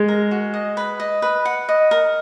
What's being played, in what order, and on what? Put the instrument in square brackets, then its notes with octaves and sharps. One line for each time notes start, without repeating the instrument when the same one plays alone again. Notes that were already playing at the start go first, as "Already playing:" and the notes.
Already playing: [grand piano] G#3
[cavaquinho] A#4
F#4
D#5
B4
D#5
B4
F#5
D#5
A#4